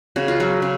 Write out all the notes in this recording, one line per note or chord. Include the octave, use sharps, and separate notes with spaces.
C#3 F#4
F4
F#3 F#4
C#3